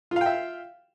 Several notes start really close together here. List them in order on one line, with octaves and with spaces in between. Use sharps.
F4 F5 G5 E5